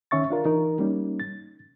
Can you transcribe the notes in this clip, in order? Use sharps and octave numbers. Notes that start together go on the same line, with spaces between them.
C#2 D#3 C#4 E5 C#6 A6
D4 F4 A#4
E3 D#4 A#4
G3 A#3 C#4 D#4
A6